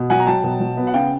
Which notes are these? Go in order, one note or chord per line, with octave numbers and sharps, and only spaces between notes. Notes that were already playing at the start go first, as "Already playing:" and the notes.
Already playing: B2
F#3 F#5 G#5
A#5
F#3 G5 A5
B2
F#3
B3
F#5
C#3 F5 G5